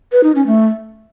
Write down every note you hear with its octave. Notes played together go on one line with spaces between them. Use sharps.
B4
D#4
C#4
A3